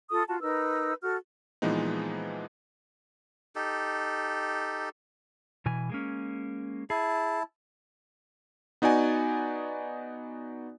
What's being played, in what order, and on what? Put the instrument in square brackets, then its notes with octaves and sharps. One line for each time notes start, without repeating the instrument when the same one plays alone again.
[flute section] F4 A4 D#6
F4 F#4 A5
D#4 A#4 B4 E6
F#4 A4 F6
[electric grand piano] A#2 E3 F3 G#3 B3 D#4
[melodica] D#4 G4 A4
[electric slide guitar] B2 E3 G#5
G#3 A#3 C#4
[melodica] E4 A5 [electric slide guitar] G#4
[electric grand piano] B3 D#4 F#4 D5 G#5